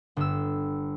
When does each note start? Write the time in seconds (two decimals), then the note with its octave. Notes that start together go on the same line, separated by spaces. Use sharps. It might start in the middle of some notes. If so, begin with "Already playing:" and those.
0.17 G1 E6